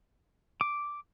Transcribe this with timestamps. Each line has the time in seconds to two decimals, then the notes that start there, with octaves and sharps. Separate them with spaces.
0.61 D6